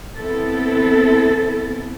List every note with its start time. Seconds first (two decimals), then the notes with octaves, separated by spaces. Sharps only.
0.17 B3 C4 E4 A4